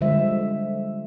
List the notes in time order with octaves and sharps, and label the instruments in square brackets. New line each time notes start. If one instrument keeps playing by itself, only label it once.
[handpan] D3 F3 G3 G#3 C5 E5